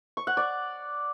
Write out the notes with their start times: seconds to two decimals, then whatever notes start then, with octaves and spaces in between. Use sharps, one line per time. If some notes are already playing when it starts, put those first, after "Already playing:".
0.17 C#6
0.27 F#5
0.37 D5